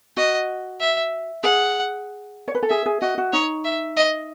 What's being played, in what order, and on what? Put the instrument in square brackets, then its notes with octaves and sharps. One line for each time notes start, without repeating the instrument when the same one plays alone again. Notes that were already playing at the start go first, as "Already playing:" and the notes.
[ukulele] F#4 [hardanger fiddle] D#5
[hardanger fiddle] E5
[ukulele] G#4 [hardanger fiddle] F#5
[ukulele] C#5
B4
A4
[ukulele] G#4 [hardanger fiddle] E5
[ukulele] G#4
[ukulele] F#4 [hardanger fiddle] D#5
[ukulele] F#4
[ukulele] D#4 [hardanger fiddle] C#5
[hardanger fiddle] E5
D#5